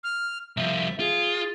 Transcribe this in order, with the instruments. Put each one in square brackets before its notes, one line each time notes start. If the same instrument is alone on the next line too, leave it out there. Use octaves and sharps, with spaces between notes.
[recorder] F6
[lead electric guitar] C2 F3 [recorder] E5
[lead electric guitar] F4 [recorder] G#4